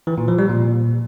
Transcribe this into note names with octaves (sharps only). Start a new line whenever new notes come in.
E3
A#2
F3
G3
A#2